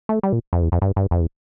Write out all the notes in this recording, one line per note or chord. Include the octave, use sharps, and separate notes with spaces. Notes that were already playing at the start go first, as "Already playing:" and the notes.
A3
G3
A#2
F2
E2
F2
G2
G2
F2
E2